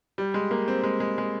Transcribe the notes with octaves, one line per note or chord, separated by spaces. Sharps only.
G3
G#3
A#3
C4
G#3
G#3
G#3